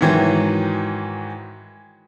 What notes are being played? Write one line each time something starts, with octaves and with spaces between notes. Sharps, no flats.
G#2 D#3 E3 F#3